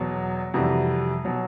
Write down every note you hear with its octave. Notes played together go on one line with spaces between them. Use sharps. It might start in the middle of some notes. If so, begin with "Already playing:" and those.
Already playing: E2 B2 F#3
F2 C3 E3 G3 F#4
B2 F#3